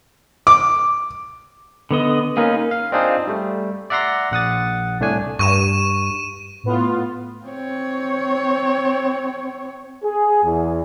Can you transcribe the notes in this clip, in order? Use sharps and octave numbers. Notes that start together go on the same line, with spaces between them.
D6
D3 B3 D#5
A#3 C#4 D#4 G#4 A#4
F5
C4 D4 D#4 F4 G#4 C5
G3 A3
D5 E5 F#5 A#5 C6 A#6
A#1 F#5 D#6 A6
C2 A2 A3 D4 G#5
G2 C#6 D#7 E7
A2 B3 F4
C4 C#5
G#4
E2